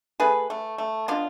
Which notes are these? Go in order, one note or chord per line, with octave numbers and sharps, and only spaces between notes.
A3 G#4 B4
A3
A3
B2 D4 F4